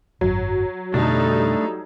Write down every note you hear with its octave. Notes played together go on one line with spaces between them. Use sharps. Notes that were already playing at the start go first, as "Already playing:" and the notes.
G#1 F#2 F#3
F2 B2 D3 G3 A3 D4 D#4 A4